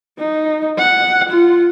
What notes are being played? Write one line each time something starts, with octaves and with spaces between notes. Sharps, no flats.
D#4
F#5
F4